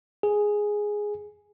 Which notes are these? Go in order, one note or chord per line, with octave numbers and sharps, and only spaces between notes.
G#4